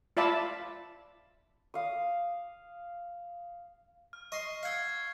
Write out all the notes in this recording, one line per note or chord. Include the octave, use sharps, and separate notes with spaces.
F4 D5 E5 A5 B5
F5 D#6
F6
D#5 C6 C#6
F5 F#5 E6 G#6 C7
G#6